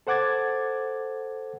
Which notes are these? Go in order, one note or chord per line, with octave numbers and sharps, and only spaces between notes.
A4 C5 F#5 D6 G#6 A6